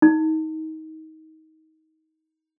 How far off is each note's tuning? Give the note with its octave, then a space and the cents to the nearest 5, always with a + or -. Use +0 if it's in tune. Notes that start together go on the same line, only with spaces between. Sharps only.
D#4 +25